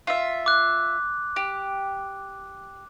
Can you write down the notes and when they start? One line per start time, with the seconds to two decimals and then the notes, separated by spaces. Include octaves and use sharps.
0.07 F4 E5
0.46 D6 F#6
1.36 G4